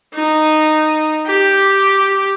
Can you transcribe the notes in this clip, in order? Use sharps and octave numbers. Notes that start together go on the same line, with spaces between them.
D#4
G4